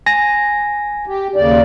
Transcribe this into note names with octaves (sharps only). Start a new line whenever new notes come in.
G#5 A#6
G4
D#2 C#3 D5